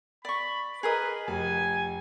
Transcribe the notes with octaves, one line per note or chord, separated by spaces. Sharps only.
D5 B5 C#6
G#4 A#4 B4 D#5
F1 G#5